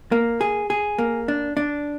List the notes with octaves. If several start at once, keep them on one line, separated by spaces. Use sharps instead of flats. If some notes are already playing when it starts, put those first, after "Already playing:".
A#3
G#4
G#4
A#3
D4
D4